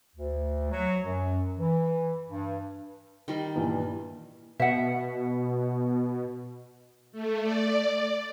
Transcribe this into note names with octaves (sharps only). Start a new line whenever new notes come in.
D2
F#3
F#2
E3
G2
D#3 G3 D#5
G2 A#2 E3
B2 E5 F#5
A3
D5